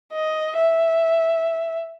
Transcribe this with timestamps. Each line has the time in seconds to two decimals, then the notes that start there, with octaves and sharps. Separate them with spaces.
0.13 D#5
0.57 E5